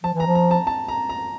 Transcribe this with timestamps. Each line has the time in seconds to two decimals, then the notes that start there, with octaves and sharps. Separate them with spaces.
0.03 F3 A5
0.14 E3
0.20 A#5
0.26 F3
0.35 A#5
0.51 A5
0.67 A5
0.88 A#5
1.09 A#5